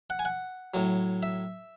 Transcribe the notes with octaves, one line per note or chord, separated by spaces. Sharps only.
F#5
G#5
F#5
A2 F#3
E5